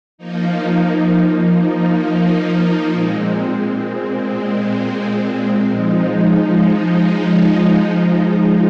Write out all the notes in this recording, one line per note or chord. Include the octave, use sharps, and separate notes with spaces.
F3 A#3 D#4
A#2 G#3 C4
F3 G#3 D#4